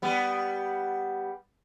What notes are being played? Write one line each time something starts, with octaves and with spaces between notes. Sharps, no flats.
G3 B3